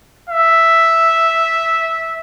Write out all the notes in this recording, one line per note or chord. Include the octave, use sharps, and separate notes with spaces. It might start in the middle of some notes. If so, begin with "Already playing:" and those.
E5